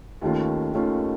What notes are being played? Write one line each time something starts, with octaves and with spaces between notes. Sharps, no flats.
D#2 D#3 A3 C#4 F4
D#2 D#3 A3 C#4 F4